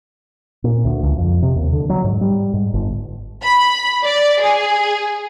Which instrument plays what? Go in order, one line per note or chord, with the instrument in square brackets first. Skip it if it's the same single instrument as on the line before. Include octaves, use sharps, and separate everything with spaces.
[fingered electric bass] A#2
D2
C#2
F2
C3
D#2
D3
F#3
G#2
G3
G#2
G1
[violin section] B5
D5
G#4